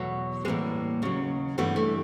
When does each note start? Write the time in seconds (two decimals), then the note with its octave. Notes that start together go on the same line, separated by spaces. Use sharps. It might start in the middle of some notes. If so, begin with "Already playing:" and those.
Already playing: E2 B2 F#3 A3
0.45 A2 E3 G3 G#3 A#3
1.02 D#2 C#3 F#3
1.58 G2 E3 G3 A3 B3
1.76 A3